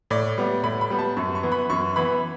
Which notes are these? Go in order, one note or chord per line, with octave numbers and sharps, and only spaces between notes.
A2 D5
G3 B3
A2 B5
B5
G3 B3
A5
F#2 C#6
C#6
E3 B3
B5
F#2 C#6
E3 B3 B5